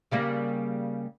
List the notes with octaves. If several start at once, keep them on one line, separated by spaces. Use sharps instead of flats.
C#3 G3 A#3